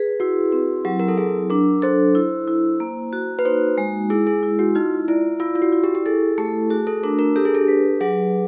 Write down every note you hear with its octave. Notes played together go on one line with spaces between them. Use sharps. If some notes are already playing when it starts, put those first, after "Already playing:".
Already playing: G#4 B4
E4 F#4
C4
F#3 G4
A#4
A4
F#3 G#4
D4 A#4
A4 C5
E4
E4
A#3
F#4
B4
D#4 C5
G#3
E4 G#4
G#4
E4
F#4
D#4 F4
E4 D5
E4 F4
F4
F#4
E4
G4
G4
G#4 A4
A3 G4
F#4 G#4
A4
D4 A#4
A#4
G4 A4
G#4
A4
B4
F#3 G#4